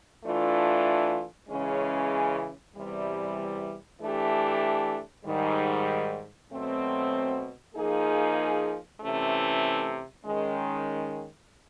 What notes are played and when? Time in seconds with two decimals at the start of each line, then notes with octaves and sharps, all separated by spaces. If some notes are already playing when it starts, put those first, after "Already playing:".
0.24 E3 A3 D4 F4
1.49 C#3 E3 G#3 C#4
2.74 E2 C3 E3 G3
4.00 E3 A3 D4 G4
5.24 G#2 D#3 G3
6.50 B2 F#3 A3 C4
7.75 F3 A#3 D#4 G#4
9.00 C3 E3 A3 C#4
10.25 D#3 G#3 C#4